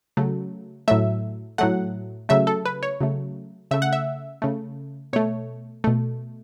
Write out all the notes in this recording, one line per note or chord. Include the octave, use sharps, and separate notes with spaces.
C#3 F#3 A3
A2 F#3 A3 E5
A2 F#3 A3 F#5
C#3 F#3 A3 E5
A4
B4
C#5
C#3 F#3 A3
C#3 A3 E5
F#5
E5
C#3 A3
B2 A3 C#5
B2 A3